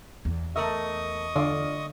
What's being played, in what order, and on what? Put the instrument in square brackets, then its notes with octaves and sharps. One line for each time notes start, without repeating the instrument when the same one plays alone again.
[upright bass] E2
[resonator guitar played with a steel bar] A3 A#4 E5 [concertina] D#5 C#6 D#6
[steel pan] D3 [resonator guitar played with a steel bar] F4 D5